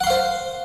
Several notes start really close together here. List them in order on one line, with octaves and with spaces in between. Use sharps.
F#5 C6 F5 C5